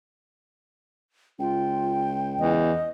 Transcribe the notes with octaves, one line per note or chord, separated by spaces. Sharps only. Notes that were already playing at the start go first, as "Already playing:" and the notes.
C#2 F4 G5
E2 D#5